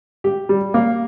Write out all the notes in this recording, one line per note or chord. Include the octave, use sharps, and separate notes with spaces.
G4
G3
A#3